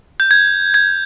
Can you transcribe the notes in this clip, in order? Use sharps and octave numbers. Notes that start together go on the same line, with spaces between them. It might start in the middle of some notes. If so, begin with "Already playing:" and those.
G6
G#6
G#6